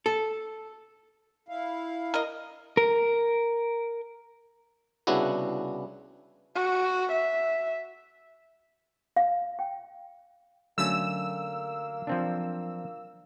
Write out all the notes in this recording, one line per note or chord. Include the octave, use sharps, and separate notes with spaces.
A4
E4 F5
A#4 D#5
A#4
C2 C#3 B3 D4 E4 F#4
F#4
E5
F5
G5
D3 F#3 A3 A#3 C#4 E6
F3 C4 D4